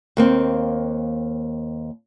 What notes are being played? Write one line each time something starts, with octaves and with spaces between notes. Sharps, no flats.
D#2 A#3 C4